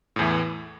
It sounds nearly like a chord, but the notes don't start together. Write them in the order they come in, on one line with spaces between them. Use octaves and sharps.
A2 E2 E3